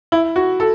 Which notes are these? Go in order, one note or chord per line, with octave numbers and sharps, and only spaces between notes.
E4
F#4
A4